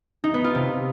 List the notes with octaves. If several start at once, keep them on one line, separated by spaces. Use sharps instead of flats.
D#4
B3
F4
C3